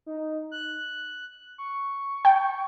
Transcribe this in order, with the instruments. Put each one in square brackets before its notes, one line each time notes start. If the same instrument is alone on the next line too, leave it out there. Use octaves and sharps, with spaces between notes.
[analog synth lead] D#4
F#6
C#6
[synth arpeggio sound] G5